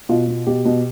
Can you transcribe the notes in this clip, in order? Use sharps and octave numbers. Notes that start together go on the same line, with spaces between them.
B2 F4
B2
B2 G4
B2